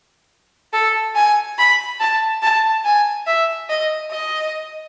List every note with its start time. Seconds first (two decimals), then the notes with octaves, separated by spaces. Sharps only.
0.73 A4
1.16 G#5
1.58 B5
2.00 A5
2.43 A5
2.85 G#5
3.27 E5
3.69 D#5
4.11 D#5